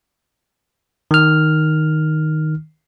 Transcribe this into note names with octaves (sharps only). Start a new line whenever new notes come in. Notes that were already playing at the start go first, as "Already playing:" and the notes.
D#3 F6